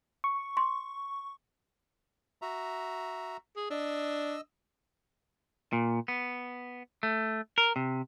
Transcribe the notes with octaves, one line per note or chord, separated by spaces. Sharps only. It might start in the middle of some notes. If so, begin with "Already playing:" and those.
C#6
C6
F#4 E5 A#5
G#4
D4 D#5 E6
A#2
B3
A3
A#4
C3